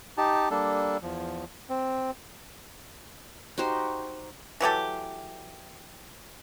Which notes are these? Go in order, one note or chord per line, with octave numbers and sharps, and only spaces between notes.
D#4 G4 A5
G3 A#3 D4 A4
E2 F3
C4
D#4 F#4 G4 C5
E3 F#3 G4 A4